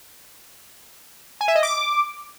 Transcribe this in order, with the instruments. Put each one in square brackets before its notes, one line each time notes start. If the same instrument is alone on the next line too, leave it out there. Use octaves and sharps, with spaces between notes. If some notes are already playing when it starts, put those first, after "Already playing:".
[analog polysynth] G#5
E5
D#5
D6